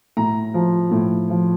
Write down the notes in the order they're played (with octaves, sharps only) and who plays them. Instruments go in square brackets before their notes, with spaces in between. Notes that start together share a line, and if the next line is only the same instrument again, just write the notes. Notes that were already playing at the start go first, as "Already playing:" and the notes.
[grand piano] A2 A#5
F3
A2
F3